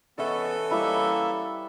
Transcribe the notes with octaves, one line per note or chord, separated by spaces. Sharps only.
E3 B3 C#4 A4 C#5 E5 C#6
G3 A#3 E4 B4 E5